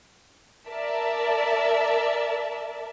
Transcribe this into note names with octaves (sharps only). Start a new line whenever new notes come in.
A#4 D5 E5 A5